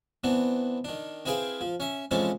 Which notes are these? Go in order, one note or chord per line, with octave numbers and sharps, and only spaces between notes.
E3 B3 C4 D4
D#3 D4
C4 E4 G#4 B4 F5 G5
F3
C#4 E5
E3 F3 G#3 C4 C#4 A4